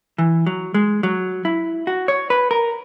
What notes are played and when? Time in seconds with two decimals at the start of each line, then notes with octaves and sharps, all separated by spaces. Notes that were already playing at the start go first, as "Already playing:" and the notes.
0.18 E3
0.47 F#3
0.74 G#3
1.03 F#3
1.45 E4
1.87 F#4
2.08 C#5
2.30 B4
2.51 A#4